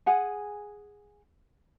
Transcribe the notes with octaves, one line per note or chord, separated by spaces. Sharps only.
G#4 F#5 G#5